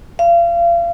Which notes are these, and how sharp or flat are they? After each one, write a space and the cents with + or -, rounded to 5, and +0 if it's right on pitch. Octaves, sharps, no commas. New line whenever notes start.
F5 -35